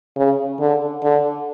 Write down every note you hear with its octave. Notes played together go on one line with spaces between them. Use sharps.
C#3
D3
D3